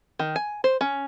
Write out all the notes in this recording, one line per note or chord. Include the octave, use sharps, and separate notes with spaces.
D#3
G#5
C5
C#4